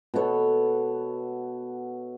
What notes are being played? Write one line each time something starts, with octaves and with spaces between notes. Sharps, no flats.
B2 B3 A4 C#5